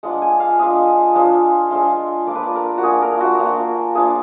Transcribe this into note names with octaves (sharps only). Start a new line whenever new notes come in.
G#3 D4 F4 F#5
G#5
F5
G#3 D4 F4 D#5
G#3 D4 F4
G#3 D4 F4
A#3 D4 F4 D5
B4
D5
A#4
F#4
A#3 D4 F4 G#4
A#4
F4 F#4
A#3 D4 F4
A#3 D4 F4 G#4